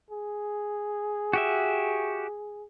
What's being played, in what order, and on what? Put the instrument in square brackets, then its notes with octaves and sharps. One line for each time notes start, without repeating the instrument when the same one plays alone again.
[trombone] G#4
[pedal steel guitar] F#4 G4 E5